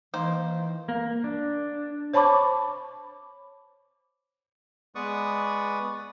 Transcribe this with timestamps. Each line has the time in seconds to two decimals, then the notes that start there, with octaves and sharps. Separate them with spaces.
0.14 D#3 E3 A#3 C5
0.88 A#3
1.24 D4
2.14 C5 C#5 A5 B5 C#6 D6
4.95 G#3 B3 B4 D5 C#6 D#6